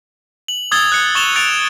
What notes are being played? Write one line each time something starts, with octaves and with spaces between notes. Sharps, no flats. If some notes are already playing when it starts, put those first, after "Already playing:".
F#7
D#6 E6 G#6 A6 G7
F#6 C#7
C#6 A6 E7 F7 G7
F#6 A6 D7 F7